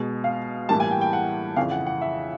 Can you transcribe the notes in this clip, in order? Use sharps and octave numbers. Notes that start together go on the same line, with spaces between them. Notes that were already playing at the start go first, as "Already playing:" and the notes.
Already playing: B2 G#3
F5
A2 E3 G3 A#3 A5
G#5
G5
G5
F#5
F2 C#3 E3 F5
F#5
F#5
E5